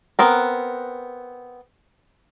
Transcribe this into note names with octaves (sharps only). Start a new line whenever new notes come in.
B3 C4 A#4